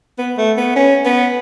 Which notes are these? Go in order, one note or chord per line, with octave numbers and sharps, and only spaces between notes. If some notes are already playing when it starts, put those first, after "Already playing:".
B3
A3
B3
C#4
B3